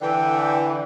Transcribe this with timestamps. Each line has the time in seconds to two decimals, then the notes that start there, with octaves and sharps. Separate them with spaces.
0.01 D3 E3 G5